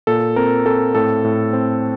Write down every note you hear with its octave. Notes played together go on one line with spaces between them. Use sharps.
A#2 A4
C4 A#4
C4 A4
A2 A4
A2
C4